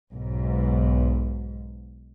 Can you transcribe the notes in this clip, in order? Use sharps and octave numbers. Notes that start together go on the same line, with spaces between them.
B1 G#2